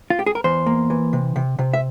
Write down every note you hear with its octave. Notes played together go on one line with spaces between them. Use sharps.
F4
G4
G#4
A#4
E2 C5
A#3
E3
C3
C3
C3
E5